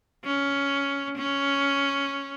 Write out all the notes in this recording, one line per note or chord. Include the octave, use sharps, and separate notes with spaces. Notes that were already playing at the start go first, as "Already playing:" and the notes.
C#4
C#4